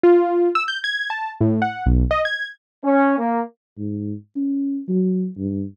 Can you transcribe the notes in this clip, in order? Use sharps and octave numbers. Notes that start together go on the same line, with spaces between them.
F4
E6
G6
G#6
A5
A2
F#5
B1
D#5
G#6
C#4
A#3
G#2
C#4
F#3
G2